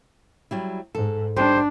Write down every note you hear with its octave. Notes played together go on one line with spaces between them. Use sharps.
F#3 G3 E4
G#2 A4
G3 D4 D#4 G4 C5